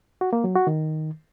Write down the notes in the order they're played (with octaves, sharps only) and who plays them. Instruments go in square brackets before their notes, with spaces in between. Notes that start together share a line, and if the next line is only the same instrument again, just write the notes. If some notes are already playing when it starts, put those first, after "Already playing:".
[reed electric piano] F#4
A#3
F#3
F#4
D#3